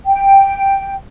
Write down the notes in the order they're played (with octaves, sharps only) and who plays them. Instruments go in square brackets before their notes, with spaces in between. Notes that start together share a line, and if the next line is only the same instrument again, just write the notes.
[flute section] G5